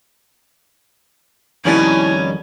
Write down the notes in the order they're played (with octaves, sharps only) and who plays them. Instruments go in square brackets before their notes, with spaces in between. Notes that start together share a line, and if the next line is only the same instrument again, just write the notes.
[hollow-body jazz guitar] F2 D#3 G3 [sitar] B2 A#3 C#4 [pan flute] E4 [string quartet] G#5